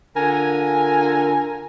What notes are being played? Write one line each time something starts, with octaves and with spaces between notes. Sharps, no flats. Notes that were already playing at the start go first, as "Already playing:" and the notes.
D3 F4 A#4 G#5